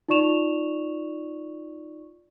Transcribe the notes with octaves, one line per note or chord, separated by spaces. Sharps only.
D#4 F4 D5 C#6 E7 F7